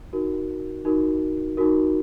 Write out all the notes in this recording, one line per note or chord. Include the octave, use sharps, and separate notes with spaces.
D#4 F#4 A#4
D#4 F#4 A#4
D#4 F#4 A#4